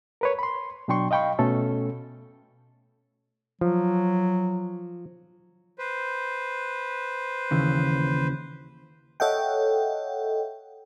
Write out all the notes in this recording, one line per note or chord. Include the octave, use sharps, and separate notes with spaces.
A#4 B4 C#5
B5 C6
B2 F#3 D4 G5 C6 C#6
D#5 F5 G5 B5 C#6
B2 A3 C#4 A4
F3 F#3
B4 C5
D#2 C#3 E3
A4 C#5 D#5 E5 F#5 G5